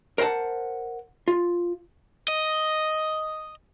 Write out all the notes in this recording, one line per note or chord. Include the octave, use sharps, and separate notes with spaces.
A#4 C5 D#5 F#5 A5
F4
D#5